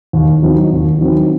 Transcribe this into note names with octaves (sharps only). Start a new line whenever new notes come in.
D#2
D#3 F#3 C4 D#4
D#2
D#3 F#3 C4 D#4